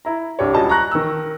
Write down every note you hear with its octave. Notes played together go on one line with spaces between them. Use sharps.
E4 A#5
C2 D4 G4 C#5
D#1 C#2 F#4 D#5 A5
A#5 C#6 F#6 A#6
D#3 E6